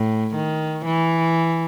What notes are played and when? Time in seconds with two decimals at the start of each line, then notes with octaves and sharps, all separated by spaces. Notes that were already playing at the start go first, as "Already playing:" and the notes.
Already playing: A2
0.35 D#3
0.85 E3